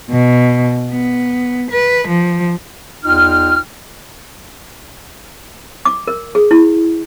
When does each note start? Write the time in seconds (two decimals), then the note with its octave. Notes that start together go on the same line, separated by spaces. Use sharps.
0.10 B2
0.92 B3
1.71 B4
2.08 F3
3.04 E2 D#4 F4 G5 F6
5.85 D6
6.08 A#4
6.35 G#4
6.51 E4